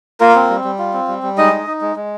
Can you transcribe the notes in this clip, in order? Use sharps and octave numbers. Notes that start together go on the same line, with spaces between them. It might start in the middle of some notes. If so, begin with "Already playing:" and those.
A#3 F4 A#4
C4
G3
G3
F4
C4
G3
G3
G#3 D#4 D#5
D#4
D#4
G#3
G#3